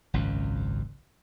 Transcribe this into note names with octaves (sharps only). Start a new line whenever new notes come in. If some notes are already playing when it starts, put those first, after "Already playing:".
G#1 C#2 F#2